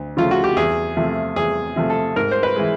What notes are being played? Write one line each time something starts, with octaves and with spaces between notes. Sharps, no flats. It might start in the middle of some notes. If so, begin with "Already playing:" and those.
Already playing: D2
C#3 F3 A3 F4
F#4
G4
E2 G#4
C3 F3 A3
E2 G#4
C3 F3 A3
A4
G#2 A#4
C5
B4
E3 G#3